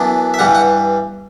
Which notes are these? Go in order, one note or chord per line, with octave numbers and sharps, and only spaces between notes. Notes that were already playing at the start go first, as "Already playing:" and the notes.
Already playing: F#2 E3 B3 D4
E5
G2 E3 G3 F#5
F#5